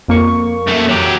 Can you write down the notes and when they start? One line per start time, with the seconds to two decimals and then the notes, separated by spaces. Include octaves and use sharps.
0.08 F2 A#3 C#6
0.67 F#2 A3
0.89 F#3 G4